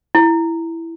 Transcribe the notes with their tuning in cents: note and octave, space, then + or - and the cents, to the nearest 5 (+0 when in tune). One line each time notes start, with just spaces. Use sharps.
E4 +5